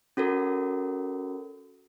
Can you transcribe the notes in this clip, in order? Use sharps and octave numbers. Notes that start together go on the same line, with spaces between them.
C#4 F#4 A4 A#4